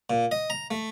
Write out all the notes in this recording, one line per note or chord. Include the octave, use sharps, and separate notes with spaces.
A#2
D#5
A#5
A3